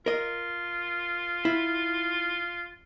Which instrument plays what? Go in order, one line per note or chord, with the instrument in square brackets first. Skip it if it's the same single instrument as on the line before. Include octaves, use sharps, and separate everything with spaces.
[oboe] F4 [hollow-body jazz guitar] A#4 D#5
[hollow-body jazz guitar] E4